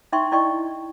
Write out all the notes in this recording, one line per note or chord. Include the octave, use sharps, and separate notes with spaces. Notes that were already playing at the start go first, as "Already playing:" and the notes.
D#4 E5 G5 C6 C#6
E4 D5 D#5 G5 C#6